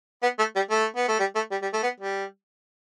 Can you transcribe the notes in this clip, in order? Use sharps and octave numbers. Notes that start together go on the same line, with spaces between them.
B3
A3
G3
A3
B3
A3
G3
A3
G3
G3
A3
B3
G3